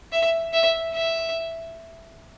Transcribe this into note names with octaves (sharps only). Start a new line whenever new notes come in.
E5
E5
E5